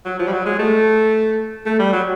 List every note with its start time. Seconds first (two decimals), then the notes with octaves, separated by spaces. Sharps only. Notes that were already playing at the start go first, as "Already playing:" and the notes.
0.05 F#3
0.19 F3
0.27 G3
0.32 F#3
0.46 G#3
0.59 A3
1.66 A3
1.79 G3
1.93 F#3